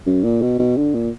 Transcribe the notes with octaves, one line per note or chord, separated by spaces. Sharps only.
F#2
A#2
B2
B2
D3
A#2